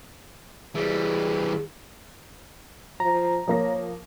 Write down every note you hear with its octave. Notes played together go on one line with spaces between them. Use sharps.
E3 G3 G#4
F3 A#5
F3 A#3 C#5 A#6